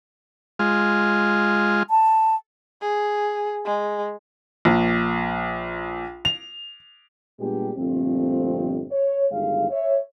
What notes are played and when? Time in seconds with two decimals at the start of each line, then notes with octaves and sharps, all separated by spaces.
0.59 G#3 F4
1.90 A5
2.82 G#4
3.65 G#3
4.65 A#1
6.25 F7
7.40 A#2 G3 G#3 B3 D4 G4
7.78 G1 A#2 F3 A3 C4
8.92 C#5
9.32 G1 D#3 G#3 F5
9.70 C#5 E5